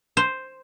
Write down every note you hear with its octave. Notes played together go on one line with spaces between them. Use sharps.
C5